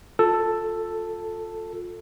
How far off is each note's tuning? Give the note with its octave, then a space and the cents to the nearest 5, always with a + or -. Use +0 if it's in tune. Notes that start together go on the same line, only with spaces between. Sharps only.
F4 +25 A4 +5